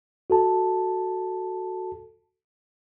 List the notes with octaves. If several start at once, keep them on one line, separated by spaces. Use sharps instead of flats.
F#4 A4 A5